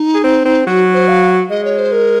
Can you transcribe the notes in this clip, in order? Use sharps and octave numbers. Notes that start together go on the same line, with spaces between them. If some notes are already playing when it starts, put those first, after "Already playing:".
Already playing: D#4
G#4
C4
C4
F#3 F#4
C5
F5
G#3 D#5
C#5
C5
A#4